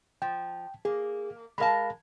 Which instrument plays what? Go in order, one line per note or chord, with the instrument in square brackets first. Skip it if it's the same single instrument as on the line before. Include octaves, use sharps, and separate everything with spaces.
[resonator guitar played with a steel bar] F3 [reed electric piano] G5
[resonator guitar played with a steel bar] A#3 [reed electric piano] G#4
[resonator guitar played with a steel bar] G#3 A#4 A5 [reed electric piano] F5 B5